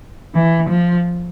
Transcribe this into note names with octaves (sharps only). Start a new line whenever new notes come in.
E3
F3